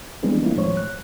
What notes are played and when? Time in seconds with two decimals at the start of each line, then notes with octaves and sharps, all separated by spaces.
0.23 E3 G3 G#3 B3 C4 D4
0.43 A3 A#3 C4 D4 E4 F4
0.56 D#2 A2 F3 G#3 C5 C#5
0.77 F#6